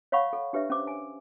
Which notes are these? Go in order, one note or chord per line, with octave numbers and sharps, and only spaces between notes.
C#5 F5 F#5 B5 C#6
A4
D4 G4 B4 C#5 E5
C#4 C5 D6
G#5